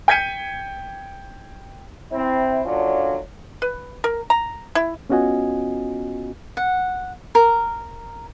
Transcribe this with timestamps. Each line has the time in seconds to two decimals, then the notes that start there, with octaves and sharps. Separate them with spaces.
0.08 G5 G6 G#6 B6 C#7 D#7
2.12 C4 E4
2.65 A#2 D3 F#3 C#4 D4 F4
3.62 B4
4.04 A#4
4.30 A#5
4.75 E4
5.10 B3 C#4 F4 F#4 D#5 G#5
6.57 F#5
7.35 A#4